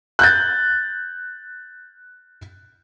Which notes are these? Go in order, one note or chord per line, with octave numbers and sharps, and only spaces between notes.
F#6 G6 A6